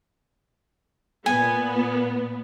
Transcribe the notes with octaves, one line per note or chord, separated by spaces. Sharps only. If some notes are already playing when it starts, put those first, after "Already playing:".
A#2 B3 G#5